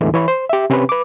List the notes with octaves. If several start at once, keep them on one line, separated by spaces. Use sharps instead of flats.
E2 A2 D3 E3 G#3
E3 C#5 B5
C5
G4 E5
C3 C4 C#4 G4 B4
B4 D6